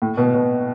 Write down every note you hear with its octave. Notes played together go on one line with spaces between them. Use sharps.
A2
B2
B2